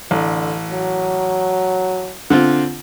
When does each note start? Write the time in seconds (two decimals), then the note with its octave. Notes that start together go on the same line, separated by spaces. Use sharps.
0.11 A1 D3
0.71 F#3
2.30 D3 C4 F4